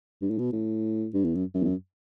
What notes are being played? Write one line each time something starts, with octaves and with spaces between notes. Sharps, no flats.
G2
A2
B2
A2
G2
E2
F#2
F#2
E2
F#2